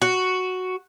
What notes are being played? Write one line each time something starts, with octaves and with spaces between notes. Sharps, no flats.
F#4